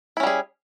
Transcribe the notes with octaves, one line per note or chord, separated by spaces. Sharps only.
G3 C#4 E4 G#4